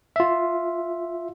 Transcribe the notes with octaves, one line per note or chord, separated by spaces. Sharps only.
F4 E5